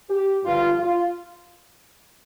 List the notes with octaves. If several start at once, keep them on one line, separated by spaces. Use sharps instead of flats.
G4
G2 D3 F3 F4
F4